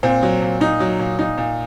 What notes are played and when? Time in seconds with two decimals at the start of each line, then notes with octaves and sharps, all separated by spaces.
0.03 A#2 C4
0.23 F#3
0.42 A#2
0.61 A#2 D#4
0.80 F#3
0.99 A#2
1.19 A#2 D#4
1.38 A#2